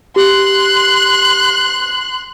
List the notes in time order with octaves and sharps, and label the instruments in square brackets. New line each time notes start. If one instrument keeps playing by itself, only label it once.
[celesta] G4 [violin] C6 F#6